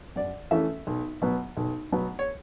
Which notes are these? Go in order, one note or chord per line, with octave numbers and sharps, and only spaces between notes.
F#2 D5
E3 A3 C#4 E5
B1
B2 F#3 B3
B1
B2 F#3 B3
C#5